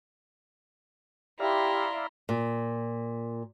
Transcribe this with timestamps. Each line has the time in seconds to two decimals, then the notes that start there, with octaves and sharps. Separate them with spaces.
1.40 E4 G4 D5 E5 F5 A#5 C6
2.29 A#2